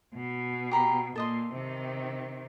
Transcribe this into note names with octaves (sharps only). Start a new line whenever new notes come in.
B2
G4 A#5 B5
A#2 A4 D#5 C6
C3 D#3